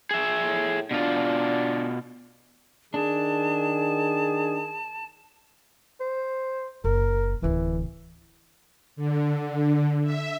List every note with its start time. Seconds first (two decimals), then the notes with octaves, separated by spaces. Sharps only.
0.11 G#4 E5
0.44 A2
0.91 B2 D4 F4
2.94 D#3 D4 G#4 A5
6.00 C5
6.84 F#1 A#4
7.42 D1 D3 E3
8.96 D3
10.04 E5